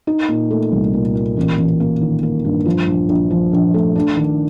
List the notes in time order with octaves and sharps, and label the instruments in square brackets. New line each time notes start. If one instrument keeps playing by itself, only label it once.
[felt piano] D#4
A#2
A3
C2
A#2
A#2
A1
A1
A#3
D#3
A#3
G2
F3
A#1
A#1
F3
A#1
A3
D4
D#3